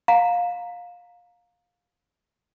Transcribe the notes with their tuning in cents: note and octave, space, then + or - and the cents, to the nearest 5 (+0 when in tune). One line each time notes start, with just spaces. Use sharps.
F5 +20 A#5 +0